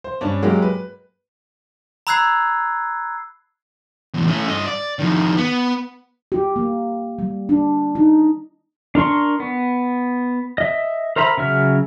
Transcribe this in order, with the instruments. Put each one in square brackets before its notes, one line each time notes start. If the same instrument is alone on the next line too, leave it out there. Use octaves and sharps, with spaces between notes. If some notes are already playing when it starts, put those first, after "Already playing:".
[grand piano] C5
G2 C#4 D4
F#3 G#3 A#3 G4
B4
[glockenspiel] A#5 B5 E6 F#6 G#6 C7
[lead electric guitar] E2 A2
A3 C#4
G2 D#5
D5
F2 D#3
B3
[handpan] G4
A#3
G3
D4
D#4
[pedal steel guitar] D4 A#4 C6 C#6
B3
D#5 E5
A#4 C5 E5 A#5 B5
C#3 F#3 E5 F6